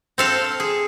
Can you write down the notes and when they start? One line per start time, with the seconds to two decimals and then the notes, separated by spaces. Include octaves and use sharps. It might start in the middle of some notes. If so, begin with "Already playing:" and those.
0.18 C4 A4 F5
0.60 G#4